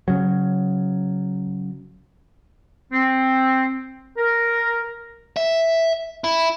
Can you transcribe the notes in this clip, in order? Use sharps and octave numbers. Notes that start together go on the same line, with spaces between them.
C#3 F#3
C4
A#4
E5
E4